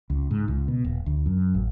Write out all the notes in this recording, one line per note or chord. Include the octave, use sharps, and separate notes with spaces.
C#2
G#2
C#2
B2
D#1
D2
F#2
A1